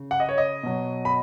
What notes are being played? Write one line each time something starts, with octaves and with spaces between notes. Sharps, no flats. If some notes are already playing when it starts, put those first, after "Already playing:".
Already playing: C#3
F#5
D#5
C#5
D#5
B2 F#3
B5